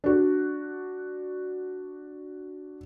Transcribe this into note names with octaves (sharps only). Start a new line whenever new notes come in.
D4 F#4